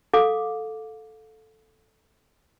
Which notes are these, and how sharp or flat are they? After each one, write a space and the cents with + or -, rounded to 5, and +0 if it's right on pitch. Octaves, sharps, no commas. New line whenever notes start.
A4 +0 F5 +30 D6 +0